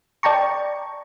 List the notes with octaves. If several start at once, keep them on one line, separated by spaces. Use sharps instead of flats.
D5 G5 A5 A#5 C#6